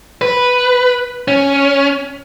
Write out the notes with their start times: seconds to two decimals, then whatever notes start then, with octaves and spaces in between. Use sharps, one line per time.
0.21 B4
1.28 C#4